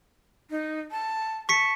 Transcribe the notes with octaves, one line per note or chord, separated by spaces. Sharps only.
D#4
A5
A5 C#6 B6 C#7